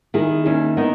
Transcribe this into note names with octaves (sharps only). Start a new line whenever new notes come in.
D#3 E4 G#4
D#2 C#4 E4
D#3 B3 D#4